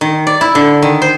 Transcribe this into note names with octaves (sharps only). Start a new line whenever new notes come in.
D#3
D5
E4
D3
D#3
C5